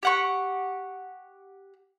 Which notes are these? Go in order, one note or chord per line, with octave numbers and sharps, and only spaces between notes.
G4 F#5 C#6